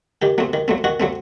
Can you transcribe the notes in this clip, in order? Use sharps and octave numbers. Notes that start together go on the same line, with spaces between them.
D#3 G4
F#3 A3 C4
D#3
F#3 A3 C4
D#3 F#4
F#3 A3 C4